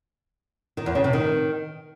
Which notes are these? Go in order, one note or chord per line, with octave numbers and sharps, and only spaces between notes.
D#3
E2
C#3
C3
D#3